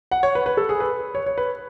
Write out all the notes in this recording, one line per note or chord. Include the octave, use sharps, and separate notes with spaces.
F#5
C#5
B4
B4
A4
G#4
B4
C#5
C#5
B4